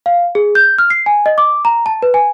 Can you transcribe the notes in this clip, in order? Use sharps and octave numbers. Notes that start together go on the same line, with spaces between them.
F5
G#4
G6
F6
C7
G#5
D#5
D6
A#5
A5
B4
G#5